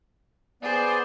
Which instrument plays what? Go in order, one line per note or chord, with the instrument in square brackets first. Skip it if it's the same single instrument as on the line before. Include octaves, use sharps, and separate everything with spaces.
[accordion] B3 D5 [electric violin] G#4 C5